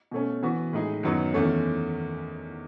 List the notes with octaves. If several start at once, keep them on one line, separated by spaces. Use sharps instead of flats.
B2 A3 C#4
E3 B3 F#4
A2 G#3 D#4 G#4
F#2 D#3 F#3 B3 D#4
E2 D#3 A3 C#4